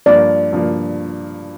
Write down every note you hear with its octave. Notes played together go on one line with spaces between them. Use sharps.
G2 F3 A#3 D5
G2 F3 A#3